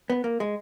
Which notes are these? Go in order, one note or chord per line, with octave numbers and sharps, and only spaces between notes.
B3
A#3
G#3